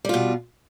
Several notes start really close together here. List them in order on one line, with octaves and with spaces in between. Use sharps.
G3 F4 B2